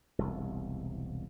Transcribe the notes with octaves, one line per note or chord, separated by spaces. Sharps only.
E1 C2